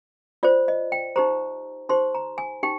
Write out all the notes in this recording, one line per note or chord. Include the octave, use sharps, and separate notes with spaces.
F4 C5 D5
D#5
G5
D#4 G4 C5 A#5
D#4 G4 C5 C6
A#5
G#5
D#4 G4 G5